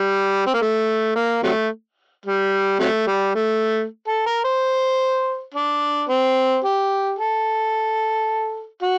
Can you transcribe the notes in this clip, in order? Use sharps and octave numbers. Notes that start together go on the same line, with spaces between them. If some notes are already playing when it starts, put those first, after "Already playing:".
Already playing: G3
C4
A#3
A3
A#3
C3 F#3 A3
G3
C3 F#3 A3
G3
A3
A4
A#4
C5
D4
C4
G4
A4
F#4